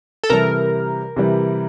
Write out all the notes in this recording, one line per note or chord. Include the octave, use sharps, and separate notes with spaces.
A4
C3 E3 G3 A#4
C3 E3 G3